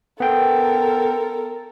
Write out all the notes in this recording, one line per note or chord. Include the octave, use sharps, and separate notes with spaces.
B3 A4 A#4 G5